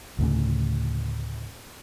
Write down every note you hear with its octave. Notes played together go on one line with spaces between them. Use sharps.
D2 A2 C#3